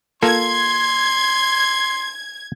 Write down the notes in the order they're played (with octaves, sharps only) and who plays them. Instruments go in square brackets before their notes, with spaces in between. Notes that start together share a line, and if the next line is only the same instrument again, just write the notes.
[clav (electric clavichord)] A#3 F4 A4 [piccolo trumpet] C6 [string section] G#6